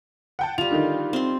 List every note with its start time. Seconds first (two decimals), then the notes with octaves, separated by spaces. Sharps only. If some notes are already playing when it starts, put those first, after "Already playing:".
0.39 F#5 G5 A5
0.58 G3 F4 F7
0.71 D3 D#3 D#4
1.13 C4 C6